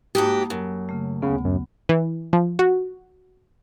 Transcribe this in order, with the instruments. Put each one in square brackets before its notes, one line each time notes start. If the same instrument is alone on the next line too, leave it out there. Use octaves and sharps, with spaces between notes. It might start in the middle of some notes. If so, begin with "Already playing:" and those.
[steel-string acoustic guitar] G#2 F#4 G4 [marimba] A#3 A5 D#6
[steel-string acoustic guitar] F#2 [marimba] F#3
[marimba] C#3 A3
[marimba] D2 B3 [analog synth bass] C#3
[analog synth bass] F#2
[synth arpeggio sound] E3
F3
F#4